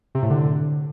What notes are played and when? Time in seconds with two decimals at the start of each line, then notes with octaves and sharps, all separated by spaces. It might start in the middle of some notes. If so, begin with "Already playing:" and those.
0.15 C3
0.22 A2
0.30 D3